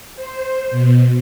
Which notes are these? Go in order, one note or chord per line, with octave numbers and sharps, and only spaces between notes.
C5
B2